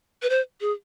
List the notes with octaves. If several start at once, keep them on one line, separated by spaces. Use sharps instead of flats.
B4
C5
G#4